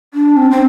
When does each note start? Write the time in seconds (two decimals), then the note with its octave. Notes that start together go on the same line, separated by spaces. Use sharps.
0.14 D4
0.37 C4
0.51 C4